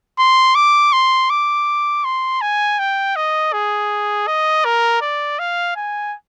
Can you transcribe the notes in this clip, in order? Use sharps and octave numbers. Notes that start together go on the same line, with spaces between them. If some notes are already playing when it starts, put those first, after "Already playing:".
C6
D6
C6
D6
C6
G#5
G5
D#5
G#4
D#5
A#4
D5
F5
G#5